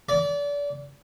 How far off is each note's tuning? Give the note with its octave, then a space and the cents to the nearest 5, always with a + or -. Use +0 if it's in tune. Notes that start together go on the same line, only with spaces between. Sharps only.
D5 -30